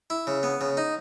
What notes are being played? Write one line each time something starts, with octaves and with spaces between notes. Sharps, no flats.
E4
C#3
B3
C#3
D#4